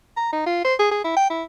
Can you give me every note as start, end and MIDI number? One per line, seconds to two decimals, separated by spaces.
0.17 0.29 82
0.32 0.45 63
0.46 0.60 65
0.65 0.74 72
0.79 0.88 68
0.91 1.01 68
1.04 1.13 64
1.16 1.28 79
1.30 1.43 64